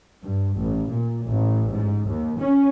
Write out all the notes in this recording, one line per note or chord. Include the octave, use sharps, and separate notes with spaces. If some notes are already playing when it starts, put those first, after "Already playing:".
G2
A1
A#2
A1
G#2
D#2
C#4